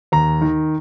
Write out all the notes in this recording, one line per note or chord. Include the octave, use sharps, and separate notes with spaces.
D#2 A#5
D#3